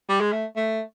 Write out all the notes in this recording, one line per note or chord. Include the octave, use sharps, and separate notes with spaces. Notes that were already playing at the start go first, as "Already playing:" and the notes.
G3
G#3
A3
A3